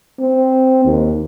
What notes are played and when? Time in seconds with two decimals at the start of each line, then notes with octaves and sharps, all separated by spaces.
0.19 C4
0.85 D#2